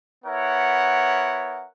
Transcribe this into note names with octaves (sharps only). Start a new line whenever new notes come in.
B3 E4 A#4 C#5 F#5